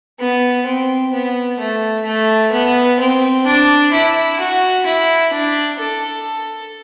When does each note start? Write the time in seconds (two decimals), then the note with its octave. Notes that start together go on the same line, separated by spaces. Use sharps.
0.20 B3
0.66 C4
1.13 B3
1.60 A3
2.06 A3
2.52 B3
3.00 C4
3.46 D4
3.93 E4
4.40 F#4
4.86 E4
5.33 D4
5.79 A4